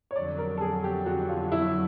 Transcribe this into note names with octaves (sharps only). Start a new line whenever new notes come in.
C#5
F2 D3 F#3 D5
A#4
A4
G#4
G4
F#4
F4
E4